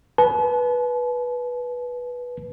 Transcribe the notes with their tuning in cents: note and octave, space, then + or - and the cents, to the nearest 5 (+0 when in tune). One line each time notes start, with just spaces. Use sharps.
B4 -10 A5 -40